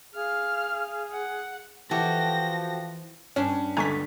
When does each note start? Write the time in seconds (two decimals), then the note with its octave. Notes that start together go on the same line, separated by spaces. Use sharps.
0.15 G#4 F5 F6
1.12 F#5
1.91 E3 F3 F#4 G4 A4 A#6
3.36 G2 C#4 D4 C#5
3.77 C#2 D3 G#5 A#5 C#6 B6